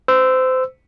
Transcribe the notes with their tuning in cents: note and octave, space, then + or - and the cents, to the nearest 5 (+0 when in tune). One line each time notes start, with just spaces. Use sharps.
C5 -25 E6 +0